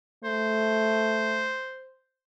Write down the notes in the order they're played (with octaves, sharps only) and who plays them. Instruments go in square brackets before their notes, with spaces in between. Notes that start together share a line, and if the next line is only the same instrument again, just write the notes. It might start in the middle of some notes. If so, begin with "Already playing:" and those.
[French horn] A3 [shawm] C5